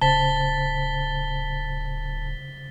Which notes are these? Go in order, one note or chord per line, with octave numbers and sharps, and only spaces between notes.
D1 C#3 C5 A5 A6 B6 G7